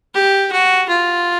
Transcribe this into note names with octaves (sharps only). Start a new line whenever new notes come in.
G4
F#4
F4